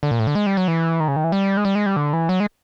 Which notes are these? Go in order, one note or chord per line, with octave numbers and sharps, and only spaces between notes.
D3
A#2
A2
D3
G#3
G3
F#3
E3
D#3
C#3
D#3
E3
G3
G#3
G3
G#3
G3
D3
E3
F#3
G#3